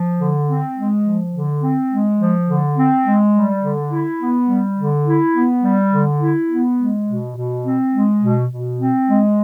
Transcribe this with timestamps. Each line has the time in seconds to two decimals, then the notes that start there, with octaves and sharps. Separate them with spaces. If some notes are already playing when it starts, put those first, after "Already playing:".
Already playing: F3
0.19 D3
0.48 C4
0.77 G#3
1.05 F3
1.33 D3
1.62 C4
1.91 G#3
2.20 F3
2.48 D3
2.77 C4
3.05 G#3
3.34 G3
3.63 D3
3.92 E4
4.21 B3
4.48 G3
4.78 D3
5.06 E4
5.35 B3
5.64 G3
5.92 D3
6.22 E4
6.50 B3
6.79 G#3
7.07 B2
7.35 B2
7.65 C4
7.93 G#3
8.21 B2
8.50 B2
8.80 C4
9.09 G#3